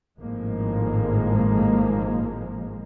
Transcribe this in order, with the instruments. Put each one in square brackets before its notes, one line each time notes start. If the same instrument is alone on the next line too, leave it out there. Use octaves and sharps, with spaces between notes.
[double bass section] G#1 A2 F3 G#3 A#3